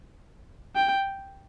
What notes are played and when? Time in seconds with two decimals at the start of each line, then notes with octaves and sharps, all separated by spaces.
0.75 G5